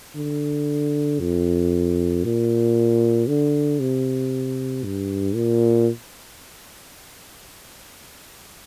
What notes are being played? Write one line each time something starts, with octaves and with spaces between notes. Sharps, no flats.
D3
F2
A#2
D3
C3
G2
A#2